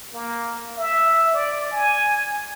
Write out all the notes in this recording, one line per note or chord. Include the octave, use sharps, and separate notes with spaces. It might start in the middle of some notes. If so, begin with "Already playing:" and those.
A#3
E5
D5
G#5